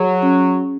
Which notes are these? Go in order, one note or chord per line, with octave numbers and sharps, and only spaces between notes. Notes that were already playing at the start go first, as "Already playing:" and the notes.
Already playing: F#3 G#4
C#4